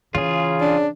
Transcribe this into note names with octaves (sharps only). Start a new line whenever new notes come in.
C#3 E3 F4 G#4
D4